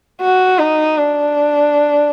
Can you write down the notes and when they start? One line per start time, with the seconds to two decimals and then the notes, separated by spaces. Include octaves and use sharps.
0.22 F#4
0.59 D#4
0.98 D4